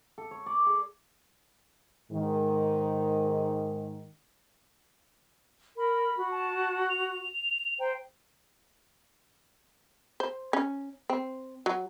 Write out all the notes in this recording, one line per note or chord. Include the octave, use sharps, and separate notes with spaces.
A4
C#5
D5
G#4
G#2 D#3
A#4 B5
F#4
A5
F7
C5 G5 A#5
C5
C#4
C4
F#3